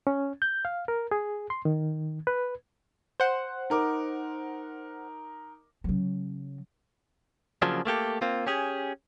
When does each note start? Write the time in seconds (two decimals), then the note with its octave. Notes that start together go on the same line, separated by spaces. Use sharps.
0.07 C#4
0.42 G6
0.65 F5
0.88 A#4
1.11 G#4
1.50 C6
1.65 D#3
2.27 B4
3.20 C5 F#5
3.70 D#4 A#4 D6
5.84 C#3 F#3
7.62 C#3 F3 F#3 A#3 C#4 D4
7.85 A3 A#3 G4 A4
8.22 A#3 C4 F4
8.47 C#4 G4 G#4